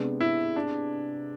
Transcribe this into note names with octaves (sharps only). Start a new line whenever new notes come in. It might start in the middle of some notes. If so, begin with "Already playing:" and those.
Already playing: C3 G#3 B3 D4
E4
D4